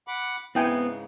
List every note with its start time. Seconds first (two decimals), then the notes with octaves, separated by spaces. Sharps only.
0.07 F#5 B5 D6
0.55 G#2 C#3 B3 C4 E4 G5 G#5